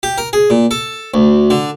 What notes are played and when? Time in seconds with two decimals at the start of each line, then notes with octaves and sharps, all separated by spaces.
0.03 G4
0.18 A#4
0.33 G#4
0.50 A#2
0.71 A4
1.14 D2
1.50 D3